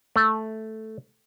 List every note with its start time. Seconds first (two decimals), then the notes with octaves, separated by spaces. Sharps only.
0.16 A3